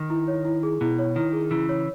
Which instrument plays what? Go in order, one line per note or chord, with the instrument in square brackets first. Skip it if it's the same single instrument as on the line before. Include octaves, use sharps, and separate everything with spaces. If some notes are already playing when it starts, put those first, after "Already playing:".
Already playing: [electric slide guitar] D#3
[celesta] E4
C#5
E4
G#4
[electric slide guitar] B2 [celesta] E4
[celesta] C#5
[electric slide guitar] D#3 [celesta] E4
[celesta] G#4
[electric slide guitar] C#3 E3 [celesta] E4
[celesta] C#5